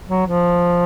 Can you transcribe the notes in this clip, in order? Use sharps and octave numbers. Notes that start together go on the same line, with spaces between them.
F#3
F3